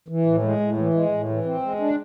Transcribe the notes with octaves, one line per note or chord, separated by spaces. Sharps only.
E3
A2
G#3
A2
E3
G#3
A2
E3
C4
G#3
D4